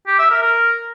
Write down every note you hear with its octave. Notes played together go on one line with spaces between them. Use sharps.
G4
E5
A#4
A#4